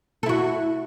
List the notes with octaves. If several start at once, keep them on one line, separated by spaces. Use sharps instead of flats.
E4 F#4 A4